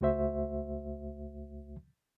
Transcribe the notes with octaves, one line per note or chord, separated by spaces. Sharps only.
C#2 A3 F#4 C5 E5